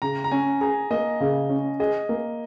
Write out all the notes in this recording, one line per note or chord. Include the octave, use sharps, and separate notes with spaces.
C#3 A#5
A#5
C#4 G#5
G#4 A#5
A#3 D#5
C#3
C#4
G#4 D#5
A#3